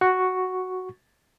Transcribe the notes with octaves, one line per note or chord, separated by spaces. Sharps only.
F#4 C#6